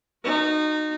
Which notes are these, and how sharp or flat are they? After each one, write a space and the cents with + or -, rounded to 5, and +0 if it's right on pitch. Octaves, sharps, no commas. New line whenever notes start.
D#4 -25 F#4 -10